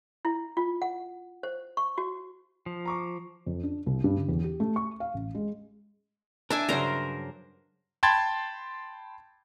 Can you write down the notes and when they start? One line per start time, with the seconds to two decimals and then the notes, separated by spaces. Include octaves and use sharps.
0.25 E4
0.57 F4
0.82 F#5
1.43 C5
1.77 C#6
1.98 F#4
2.66 F3
2.86 A#5 C#6 D6
3.46 F2
3.63 D4
3.86 C2
4.04 G2
4.17 D3
4.29 E2
4.44 G4
4.60 A3
4.76 C#6
5.00 F5
5.14 A1
5.35 G#3
6.50 D4 A#4 E5 G#5
6.69 G2 C#3 F#3 A#4 C5
8.03 G5 A5 B5 C6 G#6 A6